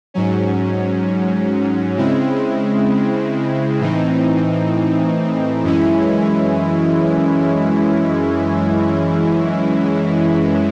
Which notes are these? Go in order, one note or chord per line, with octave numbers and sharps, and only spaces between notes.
G#2 F#3 C#4
C#3 G#3 C4 E4
A2 E3 C4 D#4
F#2 E3 G#3 C#4 E4